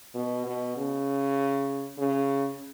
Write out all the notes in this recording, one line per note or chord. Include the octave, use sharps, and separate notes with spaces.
B2
B2
C#3
C#3